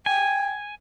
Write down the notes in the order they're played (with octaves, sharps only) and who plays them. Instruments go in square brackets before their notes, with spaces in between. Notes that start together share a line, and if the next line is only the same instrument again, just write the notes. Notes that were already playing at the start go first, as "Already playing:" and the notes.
[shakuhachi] G5 [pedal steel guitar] G#5